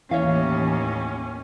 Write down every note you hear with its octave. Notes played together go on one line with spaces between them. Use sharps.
D#2 A2 E3 C#4 C#5 E5 F5